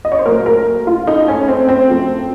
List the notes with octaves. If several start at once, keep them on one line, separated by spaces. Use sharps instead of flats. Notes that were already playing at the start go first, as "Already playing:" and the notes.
D#5
C#5
C5
A#2 F#3 A3 A#4
A#4
F4
A2 A3 D#4
C#4
C4
C4
F#2 F3 A3